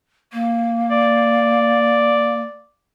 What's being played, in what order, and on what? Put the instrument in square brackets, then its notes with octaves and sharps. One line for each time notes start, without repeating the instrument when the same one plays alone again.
[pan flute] A#3
[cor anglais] D5